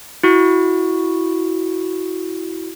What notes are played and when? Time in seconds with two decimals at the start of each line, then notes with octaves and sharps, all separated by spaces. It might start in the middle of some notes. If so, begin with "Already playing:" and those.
0.24 E4 F#4